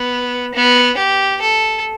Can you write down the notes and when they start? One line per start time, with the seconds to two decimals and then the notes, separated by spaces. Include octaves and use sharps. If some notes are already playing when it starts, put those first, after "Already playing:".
Already playing: B3
0.54 B3
0.98 G4
1.42 A4